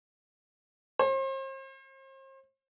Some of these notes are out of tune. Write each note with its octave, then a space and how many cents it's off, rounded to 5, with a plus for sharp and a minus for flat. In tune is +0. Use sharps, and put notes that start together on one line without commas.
C5 +40